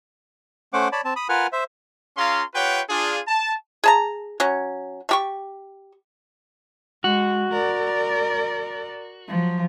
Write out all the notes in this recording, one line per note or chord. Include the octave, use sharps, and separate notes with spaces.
A3 C#4 C5 F#5 D6
C#5 D5 A5 B5
C4 A5
B5 D#6
F4 A#4 B4 F#5 G#5 F6
C5 E5
C#4 F4 G#4 F5 A#5 C6
F4 G4 B4 C#5 F#5 G5
D4 F4 G#4
A5
G#4 A5 A#5
F#3 C#4
A3 G4 C#6
G#3 F#4
A#4 D5
F3 F#3